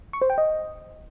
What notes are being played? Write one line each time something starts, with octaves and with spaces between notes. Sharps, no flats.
C#6
C5
G5
D#5